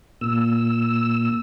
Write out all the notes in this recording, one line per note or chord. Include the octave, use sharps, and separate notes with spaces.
A#2 E6